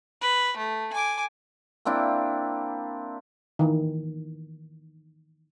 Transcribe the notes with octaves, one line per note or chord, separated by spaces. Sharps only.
B4
A3
G#5 D6
A#3 C4 D4 E4
D#3 E3